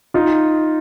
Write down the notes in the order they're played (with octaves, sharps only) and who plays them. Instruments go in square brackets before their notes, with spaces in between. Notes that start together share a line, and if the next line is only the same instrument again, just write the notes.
[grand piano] D#4 F4